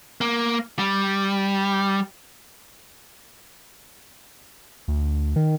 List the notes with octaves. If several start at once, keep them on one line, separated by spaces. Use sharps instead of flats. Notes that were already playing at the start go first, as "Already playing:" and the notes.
A#3
G3
D2
D#3